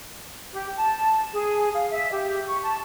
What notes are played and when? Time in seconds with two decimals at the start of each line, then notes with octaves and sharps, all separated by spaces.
0.53 G4
0.77 A5
1.33 G#4
1.74 F5
1.91 E5
2.12 G4
2.48 C#6
2.62 A5